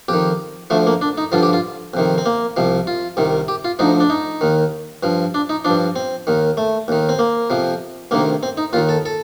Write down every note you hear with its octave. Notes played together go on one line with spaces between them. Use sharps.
F2 D#3 G4
D2 D3 F3 A3
A#3
D4
D#4
G2 D3 F3 F4
G4
F4
F2 C3 D#3
C4
A#3
C2 C3 F3
F4
C2 C3 D#3
G4
F4
D2 D3 F3 D#4
D4
D#4
D#2 D#3
G2 F3
D4
D#4
G2 F3 D4
C4
D#2 D#3
A3
D#2 D#3
C4
A#3
F2 C3 F3
D2 C3 D#3 A#3
C4
D#4
D#2 D#3 F4
A4
A4